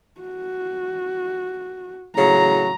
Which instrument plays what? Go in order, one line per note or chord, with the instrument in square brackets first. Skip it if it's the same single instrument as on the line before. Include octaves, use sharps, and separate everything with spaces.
[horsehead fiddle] F#4
[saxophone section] A2 C#3 F#3 [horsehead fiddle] A#5